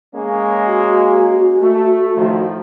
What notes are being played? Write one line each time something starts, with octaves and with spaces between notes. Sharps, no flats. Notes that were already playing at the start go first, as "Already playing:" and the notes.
G#3 A#3 C#4
F#4
A3
A2 D#3 F3